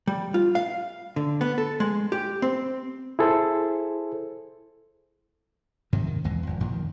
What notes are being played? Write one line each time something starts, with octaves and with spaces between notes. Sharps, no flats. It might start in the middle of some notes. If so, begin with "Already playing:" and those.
G3
F4
F5
D3
B3
A4
G#3
G4
C4
E4 G#4 A4 C5
G#2 C3 D#3 F#3
D#3
B1 E2 E3 G#3
G#1 F2
A1 F#2 A#2 F3
D#3